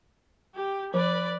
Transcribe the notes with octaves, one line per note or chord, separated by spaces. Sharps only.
G4
F3 B4 D5